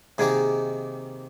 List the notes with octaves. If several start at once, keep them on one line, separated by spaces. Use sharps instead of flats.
C3 D#3 A#3 D#4 G#4